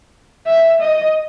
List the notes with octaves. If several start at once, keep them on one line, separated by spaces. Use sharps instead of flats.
E5
D#5